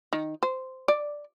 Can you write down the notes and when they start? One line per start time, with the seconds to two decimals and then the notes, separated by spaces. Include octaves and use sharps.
0.13 D#3
0.43 C5
0.88 D5